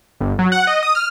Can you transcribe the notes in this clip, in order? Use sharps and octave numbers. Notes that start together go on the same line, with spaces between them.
G1
F#3
F#5
D#5
D#6
F6